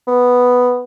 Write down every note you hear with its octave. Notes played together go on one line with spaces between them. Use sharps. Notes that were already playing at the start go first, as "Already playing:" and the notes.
B3